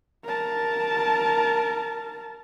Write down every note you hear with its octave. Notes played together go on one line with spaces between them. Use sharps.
A#4 A5